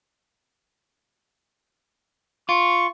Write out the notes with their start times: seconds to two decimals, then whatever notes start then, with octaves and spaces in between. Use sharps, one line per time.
2.49 F4 C#6